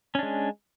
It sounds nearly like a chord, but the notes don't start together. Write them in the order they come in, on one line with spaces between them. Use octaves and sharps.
C#4 D4 G#3